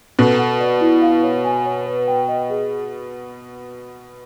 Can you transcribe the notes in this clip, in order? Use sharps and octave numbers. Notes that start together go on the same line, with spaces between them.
B2 A4
F#5
D5
E4
F5
C#5
G#5
C#5
B4
G5
D#5
G#4